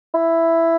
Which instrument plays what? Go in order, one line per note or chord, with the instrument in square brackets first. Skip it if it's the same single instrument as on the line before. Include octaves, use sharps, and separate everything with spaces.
[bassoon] E4